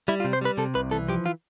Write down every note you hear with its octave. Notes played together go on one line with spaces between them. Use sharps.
G3 E4
F4
C3
C5
G3 B4
C3 A4
C2 B4
E3 A4
F3 G4
F4